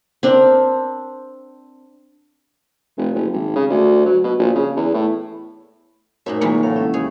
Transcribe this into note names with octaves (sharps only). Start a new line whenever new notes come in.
C4 D4 A#4
F1
F#1
G#1
C#3
D2
F#3
B2
A#1
C#3
E2
A2
F#2 A#2 A3 A#3 D#4 C5 E5
E2 C3 E3 F#3 G#3 A#3 D#4 F4
A2 F5 F#5
C#4 E4 E5
D#2 G#4 C#5